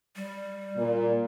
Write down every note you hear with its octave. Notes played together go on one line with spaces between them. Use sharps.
G3
A#2